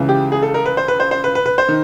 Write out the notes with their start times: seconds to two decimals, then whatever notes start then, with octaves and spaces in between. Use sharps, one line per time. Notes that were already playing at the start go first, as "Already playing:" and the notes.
Already playing: C#2 C#3 E3
0.09 G4
0.32 G#4
0.42 A4
0.54 A#4
0.66 B4
0.77 C5
0.88 B4
1.00 C5
1.11 C5
1.24 B4
1.35 B4
1.46 B4
1.58 C5
1.68 D#3